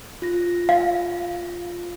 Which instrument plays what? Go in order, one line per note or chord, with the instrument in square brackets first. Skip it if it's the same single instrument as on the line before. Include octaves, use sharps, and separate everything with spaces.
[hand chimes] F4 A#6
[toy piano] F5